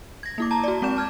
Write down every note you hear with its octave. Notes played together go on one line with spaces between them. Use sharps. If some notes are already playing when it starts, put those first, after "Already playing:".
G#6 A#6
A#3 E4 D6
A5 A#5
F#4 D5
G#3 C4 D6 G6 E7
A5 F6 G#6